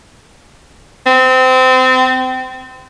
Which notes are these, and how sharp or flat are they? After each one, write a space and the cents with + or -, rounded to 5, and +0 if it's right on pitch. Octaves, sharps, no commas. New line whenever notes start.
C4 -25